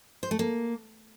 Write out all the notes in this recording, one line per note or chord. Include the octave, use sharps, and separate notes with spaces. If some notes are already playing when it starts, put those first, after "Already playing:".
C5
A3
A#3